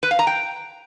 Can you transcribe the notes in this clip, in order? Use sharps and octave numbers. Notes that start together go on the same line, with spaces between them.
B4
F5
A#5
G5